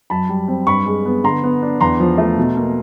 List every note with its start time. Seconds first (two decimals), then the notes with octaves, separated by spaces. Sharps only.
0.10 F#2 A5 B5
0.29 G3
0.48 C4
0.67 G2 B5 C#6
0.86 G#3
1.05 B3
1.24 D3 A#5 C6
1.44 B3
1.62 D4
1.81 E2 A#5 C6
2.00 F3
2.18 A3
2.38 B2
2.57 A#3